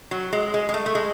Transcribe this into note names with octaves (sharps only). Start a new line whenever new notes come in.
F#3
G#3
G#3
G#3
A3
A3
G#3